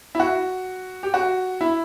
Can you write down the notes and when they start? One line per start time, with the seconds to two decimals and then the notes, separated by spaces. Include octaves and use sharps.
0.15 E4
0.20 F#4
1.03 G4
1.14 F#4
1.61 E4